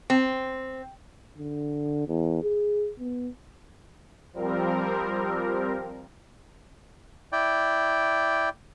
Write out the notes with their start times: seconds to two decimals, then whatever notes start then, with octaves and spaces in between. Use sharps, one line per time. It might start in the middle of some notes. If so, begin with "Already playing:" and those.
0.10 C4
1.38 D3
2.08 E2
2.42 G#4
2.99 B3
4.33 F3 G3 C4 A#4
7.32 E4 D5 G5